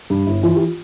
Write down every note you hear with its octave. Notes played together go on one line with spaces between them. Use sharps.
G2
G1 E4
E3 F4
G4
F4